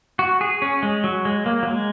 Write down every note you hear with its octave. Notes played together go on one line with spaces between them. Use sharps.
F#4
G#4
C#4
G#3
F#3
G#3
A#3
F#3
G#3